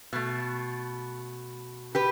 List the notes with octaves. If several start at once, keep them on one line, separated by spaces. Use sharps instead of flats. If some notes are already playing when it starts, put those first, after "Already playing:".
B2 A3
G4 B4